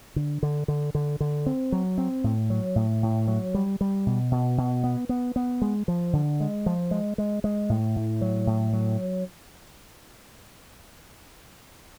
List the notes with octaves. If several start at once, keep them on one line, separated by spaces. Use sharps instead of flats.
D3
D3
D3
D3
D3
C4
F#3
C4
A2
F#3
A2
A2
F#3
G3
G3
B2
B2
B2
B3
B3
B3
G#3
F3
D3
G#3
F3
G#3
G#3
G#3
A2
A2
F#3
A2
F#3